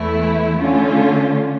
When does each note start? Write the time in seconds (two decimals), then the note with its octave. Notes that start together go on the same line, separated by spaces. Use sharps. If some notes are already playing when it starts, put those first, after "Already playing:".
Already playing: E2 E3 A3 E4
0.58 D3 A3 C#4 F4